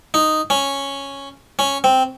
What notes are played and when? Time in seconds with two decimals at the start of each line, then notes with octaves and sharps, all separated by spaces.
0.14 D#4
0.50 C#4
1.59 C#4
1.84 C4